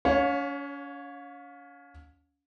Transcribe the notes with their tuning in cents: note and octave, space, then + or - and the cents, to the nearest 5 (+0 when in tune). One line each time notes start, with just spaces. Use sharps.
C#4 +35 C#5 +0 F5 +35